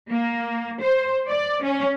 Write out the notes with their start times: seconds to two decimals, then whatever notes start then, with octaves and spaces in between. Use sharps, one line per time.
0.10 A#3
0.81 C5
1.29 D5
1.63 C#4